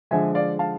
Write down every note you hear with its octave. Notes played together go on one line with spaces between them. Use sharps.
D3 F3 G#3 E5 G#5
D5 F5
F5 A5